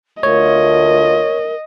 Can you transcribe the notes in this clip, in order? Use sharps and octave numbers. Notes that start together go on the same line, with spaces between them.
D2 A3 F4 A#4 C#5 D#5